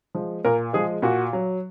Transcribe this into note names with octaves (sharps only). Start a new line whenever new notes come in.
F3 G#3
A#2 A#4
F3 G#3 G#4
A#2 F#4
F#3